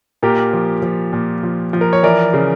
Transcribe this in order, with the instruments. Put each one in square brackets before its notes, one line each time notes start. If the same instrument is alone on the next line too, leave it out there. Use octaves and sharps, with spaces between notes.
[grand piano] A#2 G4 A#4
F3
F3
A#2
F3
F3
A#4
C#5
E3 A#4 D5
C#3